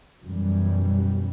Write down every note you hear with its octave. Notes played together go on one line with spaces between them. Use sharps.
F#2 B2 E3 G3